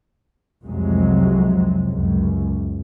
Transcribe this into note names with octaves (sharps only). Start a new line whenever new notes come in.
C2 F2 C3 F#3 G#3
C#2 F#2